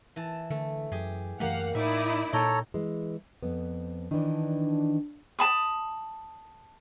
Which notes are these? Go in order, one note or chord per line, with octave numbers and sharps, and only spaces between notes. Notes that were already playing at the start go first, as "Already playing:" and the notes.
E3 A5
D3 A3
F#2 G4 G#4
F#2 E3 A3 A#3 G4 F5 F#5
A2 D#4 E4 D5 E5
A#2 A4 C#5 G5 A#5
E3 G#3
F2 B3
D#3 E3 D4
A5 B5 D#6